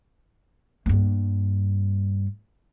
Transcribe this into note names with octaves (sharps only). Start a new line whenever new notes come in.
G2 A#3